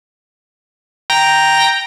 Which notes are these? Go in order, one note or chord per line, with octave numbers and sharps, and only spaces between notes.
G5 A#5 A#6